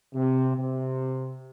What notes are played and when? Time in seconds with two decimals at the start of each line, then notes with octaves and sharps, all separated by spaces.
0.14 C3
0.57 C3